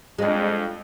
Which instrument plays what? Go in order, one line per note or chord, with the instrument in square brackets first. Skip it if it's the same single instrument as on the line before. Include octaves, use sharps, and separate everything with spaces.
[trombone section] F2 [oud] G#3 D4